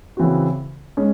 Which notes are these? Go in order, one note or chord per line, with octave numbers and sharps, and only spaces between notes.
C#3 E3 C4 F#4
G#3 C#4